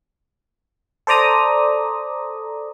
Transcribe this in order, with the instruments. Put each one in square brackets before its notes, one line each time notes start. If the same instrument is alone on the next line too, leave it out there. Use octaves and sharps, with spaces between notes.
[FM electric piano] A4 C5 D5 A#5 D#6